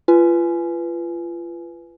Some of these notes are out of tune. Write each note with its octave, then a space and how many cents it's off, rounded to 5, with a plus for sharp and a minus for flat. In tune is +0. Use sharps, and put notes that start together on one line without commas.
F4 -30 B4 +0 G#5 +15